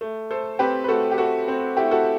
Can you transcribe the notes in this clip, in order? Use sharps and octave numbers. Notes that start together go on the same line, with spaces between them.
A3
A3 A4 C5
C4 G4 B4
B4
A3 F#4 A4
G4
A3 F#4 A4
C4
A3 E4 G4
F#4 A4